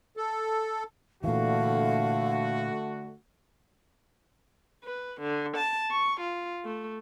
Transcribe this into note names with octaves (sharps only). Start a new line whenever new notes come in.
A4
A#2 D3 E3 A3 F#4 F5
B4
D3
A5
C#6
F4
A3